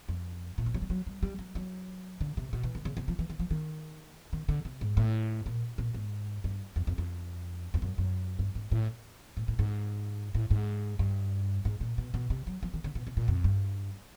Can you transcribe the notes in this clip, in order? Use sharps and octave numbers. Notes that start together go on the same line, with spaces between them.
F2
A#2
E3
F#3
G3
F#3
G3
G3
F#3
F#3
D3
C3
B2
E3
D3
C#3
C3
F3
E3
D#3
F3
D#3
D#3
D3
C3
G#2
A2
A#2
A#2
G#2
G2
F2
F2
F2
F2
F#2
F#2
G2
G#2
A2
A2
A2
G#2
A2
G#2
G2
G#2
A#2
B2
B2
C3
F#3
F3
D#3
D3
B2
C3
A#2
F2
G2